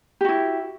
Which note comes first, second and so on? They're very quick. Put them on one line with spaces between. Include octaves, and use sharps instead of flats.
G4 F#4 E4